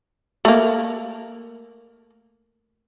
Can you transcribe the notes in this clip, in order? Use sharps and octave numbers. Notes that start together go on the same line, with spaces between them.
A3 A#3